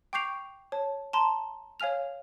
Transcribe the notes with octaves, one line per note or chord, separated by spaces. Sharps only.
G5 C#6 D6 G6 C7 F7
C#5 A5
A5 A#5 C6
C#5 F5 G#5 F6 F7